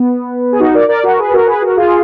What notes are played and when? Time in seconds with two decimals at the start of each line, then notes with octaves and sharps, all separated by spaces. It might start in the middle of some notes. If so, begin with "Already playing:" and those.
Already playing: B3
0.52 G#4
0.59 D#4 F#4
0.74 A#4 D5
0.88 A#4 D5
1.03 F#4 A#4
1.18 G#4 B4
1.32 F#4 A#4
1.47 G#4 B4
1.62 F#4 A#4
1.76 F4 G#4